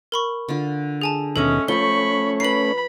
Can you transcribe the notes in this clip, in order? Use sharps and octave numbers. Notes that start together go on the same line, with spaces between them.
A#4 B5 C#6
D3 F4
G#4 G#5 A5
D#2 B2 G#3 C#4 A4 D#5 E5
F3 A3 C#4 C5 C#5 B5 C#6 G7
A#4 B4 B5 C7 F#7